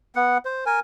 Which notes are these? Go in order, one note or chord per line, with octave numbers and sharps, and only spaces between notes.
B3 F#5
C5
A#4 G#5